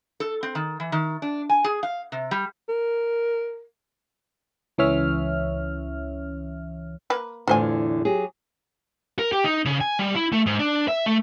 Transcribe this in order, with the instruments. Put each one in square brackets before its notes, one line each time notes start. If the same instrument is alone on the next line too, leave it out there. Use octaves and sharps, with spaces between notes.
[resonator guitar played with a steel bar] A4
C4
D#3
E3
D#3
D4
G#5
G#4
F5
C3
G3
[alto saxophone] A#4
[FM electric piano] C#2 E3 C#4 C#5 E5 F6
[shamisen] A#3 B4
[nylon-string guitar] E2 A2 D3 [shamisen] F4 C5 G#5
[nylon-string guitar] F#3 G4 G#4
[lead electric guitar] A#4
G4
D#4
C#3
G#5
G3
E4
A3
G#2
D4
E5
A3